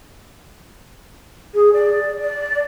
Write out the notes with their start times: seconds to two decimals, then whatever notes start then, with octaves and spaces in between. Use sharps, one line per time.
1.54 G#4
1.73 D5
2.21 D5